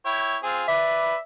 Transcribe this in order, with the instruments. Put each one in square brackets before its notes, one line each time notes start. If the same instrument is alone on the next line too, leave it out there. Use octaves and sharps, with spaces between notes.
[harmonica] E4 C#5 G5
C4 F4 G#4
[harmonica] B4 D5 [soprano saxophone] E5